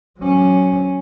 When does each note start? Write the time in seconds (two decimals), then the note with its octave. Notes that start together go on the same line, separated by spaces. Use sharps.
0.19 F#3 C#4